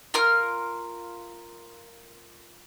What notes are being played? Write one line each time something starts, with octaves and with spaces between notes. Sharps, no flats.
F4 A#4 F6